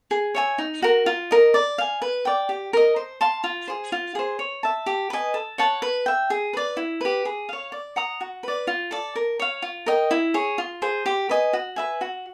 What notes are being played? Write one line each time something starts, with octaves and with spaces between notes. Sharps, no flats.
G#4
C#5 E5 G#5
D#4
F#4 A#4
F4
A#4 D#5
D5
F5 G#5
B4
D5 G5
G4
A#4 D#5
C5
F5 A5 C6
F4
G#4 C5
F4
G#4 C5
C#5
E5 A5
G4
B4 D#5 G#5
A4
C#5 F#5 A5
B4
E5 G5
G#4
B4 D5
E4
G4 B4
G#4
C#5 F5
D5
F#5 A#5 D#6
F#4
B4 D5
F4
A4 D5
A#4
C#5 F5
F4
A#4 D#5 G5
E4
G#4 C#5
F4
G#4 C5
G4
B4 D#5 G#5
F#4
B4 E5 G#5
F#4